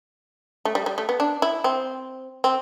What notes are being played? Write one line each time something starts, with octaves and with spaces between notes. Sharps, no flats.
A3
G3
G3
A3
B3
D4
E4
C4
C4